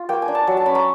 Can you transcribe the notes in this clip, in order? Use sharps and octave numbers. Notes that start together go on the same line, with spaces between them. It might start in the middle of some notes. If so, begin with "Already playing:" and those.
Already playing: F4
A#3 G5
G#5
D4
A5
F#3
A5
C#4 B5
A#5